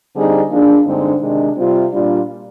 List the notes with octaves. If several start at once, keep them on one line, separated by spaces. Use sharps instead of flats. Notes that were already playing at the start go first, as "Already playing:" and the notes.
D3 G3 C4 D#4 G#4
F3 A#3 D4 G#4
G2 D3 G#3 C4 D#4
C3 D#3 G#3 D4
C3 G3 C4 F4
A#2 G3 D4 F4